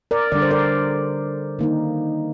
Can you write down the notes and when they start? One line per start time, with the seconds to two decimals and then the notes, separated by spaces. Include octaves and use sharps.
0.11 A#4 D5
0.32 D3 G3 D4 D5
0.42 C5
0.51 A#4 D5
1.59 D#3 A#3 D#4